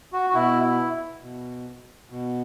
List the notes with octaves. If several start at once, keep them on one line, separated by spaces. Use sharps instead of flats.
F#4
F#4
B2 E4
E4
B2
B2